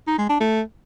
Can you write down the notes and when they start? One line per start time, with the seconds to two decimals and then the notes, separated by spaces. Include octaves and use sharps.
0.07 D#4
0.18 G#3
0.29 D4
0.40 A3